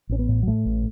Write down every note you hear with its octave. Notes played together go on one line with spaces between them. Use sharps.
A1 C#4
B3
A2
F#3
A2 A3
A1